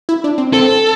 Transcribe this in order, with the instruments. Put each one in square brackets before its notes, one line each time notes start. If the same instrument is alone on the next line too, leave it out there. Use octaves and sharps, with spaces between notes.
[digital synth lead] E4
D4
C4
[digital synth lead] C4 [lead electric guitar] A4